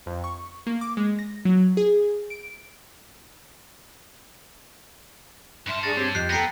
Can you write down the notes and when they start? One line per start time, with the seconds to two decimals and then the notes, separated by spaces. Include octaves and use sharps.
0.06 F2
0.24 C#6
0.67 A#3
0.81 D6
0.97 G#3
1.19 A#6
1.45 F#3
1.77 G#4
2.30 D7
5.68 G2 E5 A5 C6 F6
5.83 D4 G#4 A#5 C#6 A6
5.97 C4 G4 C#5 G#6
6.15 F2 G4 D#5 F#6 C7
6.30 B3 A4 G5 A#5 A#6 C7 D7